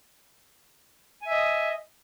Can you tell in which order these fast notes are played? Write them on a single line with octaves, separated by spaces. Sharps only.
G#5 E5 D#5